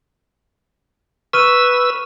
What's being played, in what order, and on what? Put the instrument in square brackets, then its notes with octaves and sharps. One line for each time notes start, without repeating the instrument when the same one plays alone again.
[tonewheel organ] B4 E6 [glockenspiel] C#6 F6 D#7